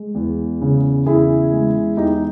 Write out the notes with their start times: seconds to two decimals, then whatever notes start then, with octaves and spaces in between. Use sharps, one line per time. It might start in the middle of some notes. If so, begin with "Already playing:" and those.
Already playing: G#3
0.15 E2
0.61 C#3
1.06 E2 E4 G#4
1.52 G#3
1.97 E2 D#4 G4